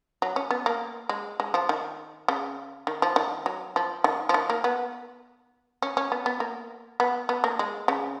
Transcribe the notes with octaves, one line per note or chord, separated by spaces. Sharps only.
F#3
C#4
B3
A#3
G#3
G#3
F3
D#3
C#3
D#3
F3
D#3
F#3
F3
D#3
F3
D#3
A#3
B3
C#4
C#4
B3
B3
A#3
B3
B3
A#3
G#3
C#3